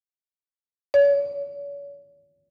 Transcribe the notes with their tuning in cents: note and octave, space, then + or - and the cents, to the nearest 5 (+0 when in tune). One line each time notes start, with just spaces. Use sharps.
C#5 +40